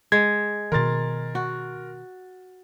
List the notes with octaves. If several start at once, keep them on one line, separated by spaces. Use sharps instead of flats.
G#3 G#6
B2 D#3 A#4 C6 A6
F#4